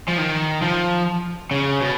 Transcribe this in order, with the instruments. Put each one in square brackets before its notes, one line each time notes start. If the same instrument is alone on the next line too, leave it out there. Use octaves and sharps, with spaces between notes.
[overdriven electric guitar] F3
D#3
F3
C#3
B2